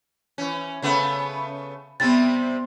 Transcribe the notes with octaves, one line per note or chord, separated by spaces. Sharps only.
E3 C#4
C#3 A3 B3
C3 G3 B3 C4 A6